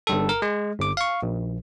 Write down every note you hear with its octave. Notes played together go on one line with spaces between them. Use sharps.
G1 G2 A4
A#4
G#3
G1 D6
F5 C#6
A#1